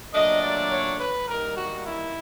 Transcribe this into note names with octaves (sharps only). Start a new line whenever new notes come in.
A#2 F#3 A3 D4 D#5
D5
C#5
B4
D#3 G3 A#3 D#4 A#4
F#4
E4